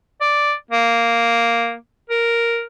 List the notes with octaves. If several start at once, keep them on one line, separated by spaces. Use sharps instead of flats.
D5
A#3
A#4